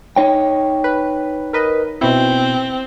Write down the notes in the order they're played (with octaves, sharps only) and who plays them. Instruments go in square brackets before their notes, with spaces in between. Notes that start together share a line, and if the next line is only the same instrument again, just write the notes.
[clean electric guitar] D#4 C#5 G5
[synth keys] B4
A#4 B4 D#5
[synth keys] B2 E4 [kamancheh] C4